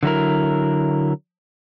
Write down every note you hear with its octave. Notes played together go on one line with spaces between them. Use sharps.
D3 F#3 E4 A#4